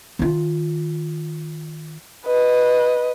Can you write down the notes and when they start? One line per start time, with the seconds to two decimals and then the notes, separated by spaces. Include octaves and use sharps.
0.19 D#3 F4
2.26 B4 D#5